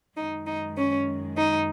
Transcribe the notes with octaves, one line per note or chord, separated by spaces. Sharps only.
F#2 D#3 G#3 D#4
D#4
C#4
D#4